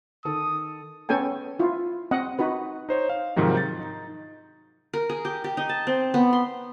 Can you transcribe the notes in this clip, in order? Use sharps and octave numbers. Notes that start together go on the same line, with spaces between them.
D#3 A4 D#6
B3 C#4 A4 G5 G#5
E4 F4
C4 D#5 F#5
D#4 F#4 B4
D#4 C5 C#5
F5
G#2 C3 D#3 F3 F#3
G6 A6
D#4
A#4
G#4
G4
G4
D#4
A5
C4
B3
C6